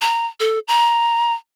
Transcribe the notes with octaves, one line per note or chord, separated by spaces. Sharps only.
A#5
A4
A#5